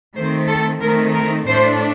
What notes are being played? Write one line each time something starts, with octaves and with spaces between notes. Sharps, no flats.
D#3 A3 C4 C5
A4
D#3 A3 C4 D#4 A#4
A#4
A2 A3 D4 C5